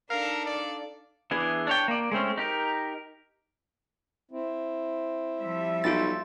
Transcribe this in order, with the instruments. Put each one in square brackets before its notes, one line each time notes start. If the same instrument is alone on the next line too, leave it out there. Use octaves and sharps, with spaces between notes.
[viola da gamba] D4 D#4 A4 [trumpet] A#4 [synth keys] F5
[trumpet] D5
[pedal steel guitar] E3 B3 D4 G#4
D4 C#5 G5
A#3 D5
G#3 A3 C4 C#4
D#4 G4 A#4
[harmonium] C4 E4
[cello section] F3 G3 E5
[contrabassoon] B1 [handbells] F4 A6